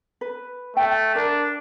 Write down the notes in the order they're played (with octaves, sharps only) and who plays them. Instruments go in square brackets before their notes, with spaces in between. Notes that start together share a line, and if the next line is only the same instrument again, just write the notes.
[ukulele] B4
[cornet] A3 [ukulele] G5
[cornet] D4 [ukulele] A#4